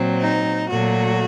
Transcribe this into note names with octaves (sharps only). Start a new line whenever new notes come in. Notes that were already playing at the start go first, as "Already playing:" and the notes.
Already playing: A#2 F#3 C4
D#4
A#2 F#3 A3 F#4